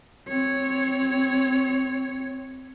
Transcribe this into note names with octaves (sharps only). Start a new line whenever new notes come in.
C4 C#5